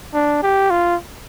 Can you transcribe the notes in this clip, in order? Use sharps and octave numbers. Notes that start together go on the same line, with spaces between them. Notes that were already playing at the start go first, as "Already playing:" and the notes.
D4
G4
F4